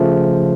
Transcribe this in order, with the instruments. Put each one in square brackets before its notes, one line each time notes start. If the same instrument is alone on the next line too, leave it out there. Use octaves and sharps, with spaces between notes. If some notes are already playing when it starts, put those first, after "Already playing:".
Already playing: [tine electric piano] C#3 F3 A3